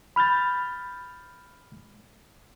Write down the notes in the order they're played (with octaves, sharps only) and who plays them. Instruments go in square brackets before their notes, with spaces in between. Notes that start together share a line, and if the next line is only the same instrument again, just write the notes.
[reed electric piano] B5 F6 G6 A6